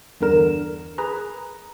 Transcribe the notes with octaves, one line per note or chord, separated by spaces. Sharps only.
E2 G2 D3 A#4 E7
G#4 B4 A#5